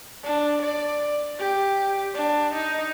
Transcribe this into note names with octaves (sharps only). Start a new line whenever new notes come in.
D4
D5
G4
D4
D#4